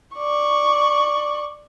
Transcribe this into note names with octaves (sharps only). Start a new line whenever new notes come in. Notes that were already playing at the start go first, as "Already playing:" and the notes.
D5 C#6